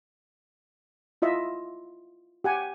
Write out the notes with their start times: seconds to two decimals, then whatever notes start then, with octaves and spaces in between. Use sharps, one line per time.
1.22 E4 F4 D#5 E5
2.44 G4 F#5 G#5